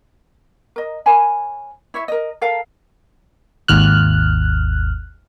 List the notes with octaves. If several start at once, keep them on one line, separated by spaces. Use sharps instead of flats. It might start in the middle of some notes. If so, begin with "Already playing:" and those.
A#4 D#5
A#4 C#5 G#5 B5
E4 C#5 E5
A#4 D#5
A4 A#4 F5
G#1 D#2 F6 F#6